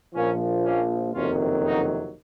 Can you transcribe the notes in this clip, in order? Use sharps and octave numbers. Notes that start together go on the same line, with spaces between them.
A#1 A#2 F3 A#3 C#4
A#3 C#4
F#1 F2 C3 D#3 F#3 C#4 F4
D#4 F#4